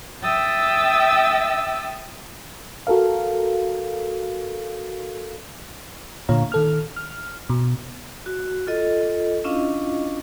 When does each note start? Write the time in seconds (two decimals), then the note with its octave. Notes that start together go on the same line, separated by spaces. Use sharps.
0.23 E5 G5 D#6 E6 A6
2.87 F#4 A4 A#4 F5
6.29 A#2 D3 F4 C#5 F5 A#5
6.52 D#3 A4 F6
6.96 F6
7.50 B2
8.26 F#4
8.67 F4 A4 D#5
9.44 C#4 D4 E4 F4 D#5 F5